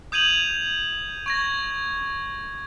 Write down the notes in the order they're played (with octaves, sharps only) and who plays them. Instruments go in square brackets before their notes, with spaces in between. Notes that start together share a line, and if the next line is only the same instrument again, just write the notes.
[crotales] D#6 G6 G#6 D#7 F7 F#7
C#6 G#6 A#6